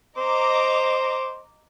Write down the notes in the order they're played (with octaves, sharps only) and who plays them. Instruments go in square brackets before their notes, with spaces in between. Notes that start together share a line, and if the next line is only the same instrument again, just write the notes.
[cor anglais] C5 [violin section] D#5 A#5 D6